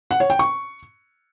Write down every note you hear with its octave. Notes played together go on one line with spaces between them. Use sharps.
F#5
C#5
G5
C#6